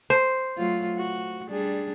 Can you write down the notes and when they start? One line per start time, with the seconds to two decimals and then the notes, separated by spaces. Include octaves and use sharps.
0.10 C5
0.57 F#3 A3 F4
0.98 F#4
1.48 G3 D4 G#4